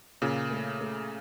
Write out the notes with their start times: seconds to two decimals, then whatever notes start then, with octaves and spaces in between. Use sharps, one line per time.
0.21 A#2 C#3 F4
0.51 A3
0.81 A3